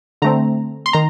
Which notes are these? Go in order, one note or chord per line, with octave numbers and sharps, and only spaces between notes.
D3 A3 C4 A#5
C6
D#3 A#5